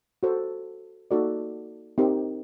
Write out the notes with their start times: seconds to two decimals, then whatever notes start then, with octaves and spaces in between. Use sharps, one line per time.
0.23 F#4 A4 C5
1.11 A#3 D#4 F#4 A4 D5
1.98 C4 D#4 G4 A#4